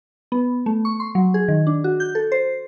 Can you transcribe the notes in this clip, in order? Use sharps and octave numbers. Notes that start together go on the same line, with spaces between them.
B3
A3
C#6
C6
F#3
G#4
D#3
D4
F#4
G6
A4
C5